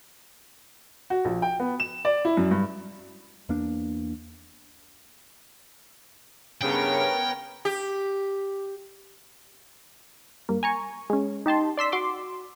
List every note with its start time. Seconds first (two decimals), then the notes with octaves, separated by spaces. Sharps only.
1.10 F#4
1.25 A#1
1.42 G5
1.60 B3
1.80 E7
2.05 D5
2.25 E4
2.37 F#2
2.51 G2
3.49 E2 A#3 D4
6.62 G2 C#3 B3 A#4 C#5 G5
7.65 G4
10.49 G2 A#3
10.63 G#5 A#5 C#6
11.10 G#3 C#4
11.46 D#4 G4 A5 C6
11.77 D5 C6 E6 B6
11.92 F#4 C6 D6